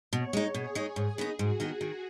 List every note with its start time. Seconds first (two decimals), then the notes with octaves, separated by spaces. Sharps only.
0.12 B2 C#5
0.33 G#3 D#4
0.54 B2 G#4
0.75 G#3 D#4
0.96 G#2
1.18 D#3 B3 D#4
1.38 G#2 F#4
1.60 D#3 B3 D#4
1.81 D#3